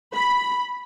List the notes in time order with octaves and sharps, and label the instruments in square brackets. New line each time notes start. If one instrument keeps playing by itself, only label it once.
[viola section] B5